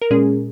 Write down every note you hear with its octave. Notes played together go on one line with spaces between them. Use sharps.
A#4
A#2 G#3 C#4 G#4